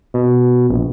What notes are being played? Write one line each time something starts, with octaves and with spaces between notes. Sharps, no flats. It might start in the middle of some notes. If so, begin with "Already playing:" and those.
B2
A#1